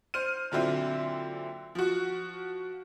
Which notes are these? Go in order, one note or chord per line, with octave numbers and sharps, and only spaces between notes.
C5 F6 D#7
A#2 D3 F#3 C4 E4
F3 F#4